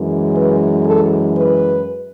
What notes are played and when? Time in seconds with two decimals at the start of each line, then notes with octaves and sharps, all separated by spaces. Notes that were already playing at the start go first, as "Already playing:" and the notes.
Already playing: F#2 E3 G#3
0.34 B4
0.85 A4
1.37 B4